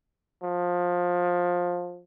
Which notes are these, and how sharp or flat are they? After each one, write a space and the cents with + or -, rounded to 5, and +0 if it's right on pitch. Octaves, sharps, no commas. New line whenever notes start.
F3 +20